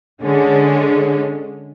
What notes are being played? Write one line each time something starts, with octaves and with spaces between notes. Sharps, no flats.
D3 G#3 C#4